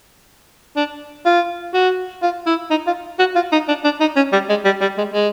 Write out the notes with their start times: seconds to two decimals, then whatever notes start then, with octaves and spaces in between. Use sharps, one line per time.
0.76 D4
1.26 F4
1.74 F#4
2.22 F4
2.46 E4
2.70 D#4
2.87 F4
3.19 F#4
3.35 F4
3.52 D#4
3.68 D4
3.84 D4
4.01 D#4
4.16 C#4
4.33 G3
4.49 G#3
4.65 G3
4.81 G3
4.98 G#3
5.14 G#3